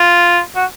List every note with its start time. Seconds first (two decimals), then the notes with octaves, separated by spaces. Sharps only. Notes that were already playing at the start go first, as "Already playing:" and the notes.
Already playing: F4
0.56 F#4